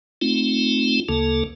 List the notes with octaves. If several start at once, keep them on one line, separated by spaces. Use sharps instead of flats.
A3 C4 D#4 F4
D2 C#3 A#3 A4